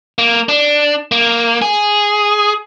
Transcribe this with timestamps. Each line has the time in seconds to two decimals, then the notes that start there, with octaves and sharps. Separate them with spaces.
0.18 A#3
0.49 D4
1.12 A#3
1.62 G#4